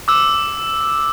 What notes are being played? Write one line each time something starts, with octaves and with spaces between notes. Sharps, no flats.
D6 E6